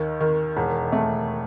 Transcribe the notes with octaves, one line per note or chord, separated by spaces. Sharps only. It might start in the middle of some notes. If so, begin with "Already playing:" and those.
Already playing: D#2 D#3
D#3
E1
A3